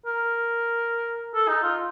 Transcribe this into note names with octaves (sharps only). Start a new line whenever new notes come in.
A#4
A4
D#4
F4